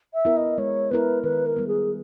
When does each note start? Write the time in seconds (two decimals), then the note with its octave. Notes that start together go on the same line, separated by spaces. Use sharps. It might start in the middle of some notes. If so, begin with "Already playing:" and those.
0.14 E5
0.25 B3 E4 A#4
0.37 D#5
0.58 G#3 C#5
0.91 B3 E4 A#4 B4
1.24 D#3 B4
1.46 A#4
1.56 G3 B3
1.68 G#4